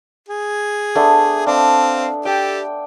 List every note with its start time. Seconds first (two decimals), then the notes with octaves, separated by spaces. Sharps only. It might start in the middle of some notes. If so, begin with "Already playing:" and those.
0.29 G#4
0.95 A3 B3 D4
1.47 C4 D4 F5
2.25 G4 A4 G5